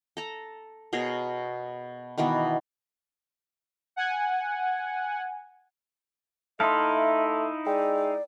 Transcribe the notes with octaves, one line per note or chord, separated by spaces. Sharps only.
A4 A#5
B2 G#4 A#4 C#5
B2 D#3 E3 B3
F#5 G#5
A3 D#4 E4 E5 F5 A5 A#5 C6
G#3 D5 G5